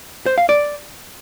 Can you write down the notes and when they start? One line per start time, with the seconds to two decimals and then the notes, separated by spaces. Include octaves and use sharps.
0.26 C5
0.38 F5
0.49 D5